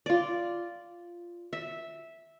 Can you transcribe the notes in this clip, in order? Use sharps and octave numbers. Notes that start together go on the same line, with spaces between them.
F4 D5
E5